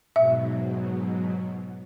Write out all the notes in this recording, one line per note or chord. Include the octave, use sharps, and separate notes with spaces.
G#2 B2 F#3 E5